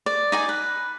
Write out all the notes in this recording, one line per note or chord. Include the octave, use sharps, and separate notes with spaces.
D5
D#4 D5 G#5
B4